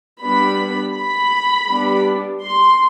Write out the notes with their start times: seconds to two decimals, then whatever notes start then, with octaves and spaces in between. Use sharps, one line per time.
0.23 G3 B3 D4 B5
0.96 B5
1.68 G3 B3 D4
2.41 C6